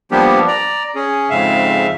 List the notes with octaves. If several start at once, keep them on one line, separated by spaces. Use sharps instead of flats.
F3 G3 A#3 B3 D4 G4
D5 A#5
C#4 G#4
F2 G#2 C#3 E5 F5